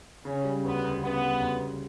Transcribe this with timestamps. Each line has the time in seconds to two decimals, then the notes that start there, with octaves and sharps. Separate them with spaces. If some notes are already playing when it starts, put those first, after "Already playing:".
0.25 C#3 C#4
0.44 G3
0.64 D2 B3
0.84 D2
1.02 C#3 B3
1.21 G3
1.40 D2
1.59 D2